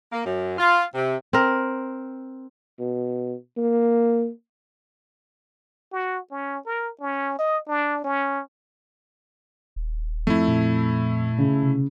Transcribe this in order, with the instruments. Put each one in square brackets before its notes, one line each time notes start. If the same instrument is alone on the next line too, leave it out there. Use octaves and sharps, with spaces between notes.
[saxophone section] A#3
F#2
F4
C3
[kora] C4 A#4
[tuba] B2
A#3
[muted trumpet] F#4
C#4
A#4
C#4
D#5
D4
C#4
[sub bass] D#1
[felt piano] F2 [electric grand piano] A3 E4
[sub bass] A#2
[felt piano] C#3
[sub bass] C3